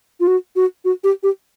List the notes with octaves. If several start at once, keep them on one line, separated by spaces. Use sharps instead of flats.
F4
F#4
F#4
F#4
G4
G4